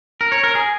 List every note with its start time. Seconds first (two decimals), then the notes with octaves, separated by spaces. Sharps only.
0.21 A#4
0.32 C#5
0.44 A#4
0.55 G#4